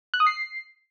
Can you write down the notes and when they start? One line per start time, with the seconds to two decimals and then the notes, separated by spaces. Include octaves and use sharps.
0.14 F#6
0.20 D#6
0.27 C7